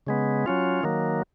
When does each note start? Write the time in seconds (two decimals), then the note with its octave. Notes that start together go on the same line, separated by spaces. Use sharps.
0.07 C#3 G#3 B3
0.46 F#3 C#4 F4
0.83 D#3 F#3 A#3